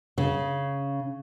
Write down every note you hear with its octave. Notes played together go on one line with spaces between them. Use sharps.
C#3